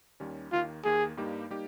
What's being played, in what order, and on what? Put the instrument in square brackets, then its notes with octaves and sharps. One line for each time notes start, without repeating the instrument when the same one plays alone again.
[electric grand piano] D#2 D#3 G3 C#4
[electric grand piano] D#2 D#3 A#3 [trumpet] F4
[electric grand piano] D#2 D#3 A#3 [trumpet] G#4
[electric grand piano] G2 G3 A#3 D#4 G4
G3 A#3 D#4 G4